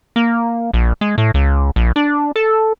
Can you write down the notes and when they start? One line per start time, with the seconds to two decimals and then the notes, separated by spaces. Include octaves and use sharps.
0.16 A#3
0.74 A#1
1.01 G#3
1.18 A2
1.34 C#2
1.76 A#1
1.96 D4
2.36 A4